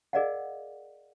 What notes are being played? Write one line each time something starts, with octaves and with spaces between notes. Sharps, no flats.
G#4 A#4 D5 D#5 F5 F#5